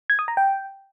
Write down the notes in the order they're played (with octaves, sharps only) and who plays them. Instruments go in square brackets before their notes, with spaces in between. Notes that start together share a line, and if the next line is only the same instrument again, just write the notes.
[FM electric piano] G#6
D#6
A#5
G5